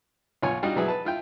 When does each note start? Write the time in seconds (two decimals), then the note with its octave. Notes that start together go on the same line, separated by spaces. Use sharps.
0.43 B1 F4 C#5 G#5
0.63 G3 D4 D#4 F4 F#4
0.76 B2 F3 F#3 B3 E4 G#4
0.88 B4 A5
1.05 E4 F4 G5